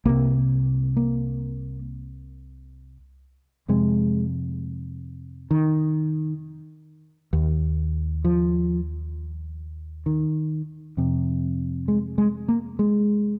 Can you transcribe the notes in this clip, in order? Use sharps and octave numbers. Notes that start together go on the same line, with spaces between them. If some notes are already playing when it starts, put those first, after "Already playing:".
C2 C3 A#3
A#3
F2 C3 G#3
D#3
D#2
F3
D#3
F2 C3
G#3
G#3
A#3
G#3